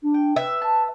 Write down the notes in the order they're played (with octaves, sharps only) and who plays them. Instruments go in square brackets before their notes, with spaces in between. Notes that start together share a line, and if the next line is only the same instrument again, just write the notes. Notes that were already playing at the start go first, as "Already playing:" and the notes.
[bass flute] D4
[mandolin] G5
[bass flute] B4 [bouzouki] E5
[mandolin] A5